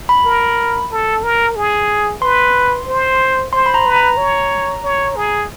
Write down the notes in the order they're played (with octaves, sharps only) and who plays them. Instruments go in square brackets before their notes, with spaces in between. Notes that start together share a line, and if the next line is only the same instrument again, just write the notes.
[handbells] B5
[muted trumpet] A#4
A4
A#4
G#4
[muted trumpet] B4 [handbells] C6
[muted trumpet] C5
[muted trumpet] C5 [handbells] C6
[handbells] B5
A#5
[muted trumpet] B4
[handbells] A#5
[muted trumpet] C#5
C#5
G#4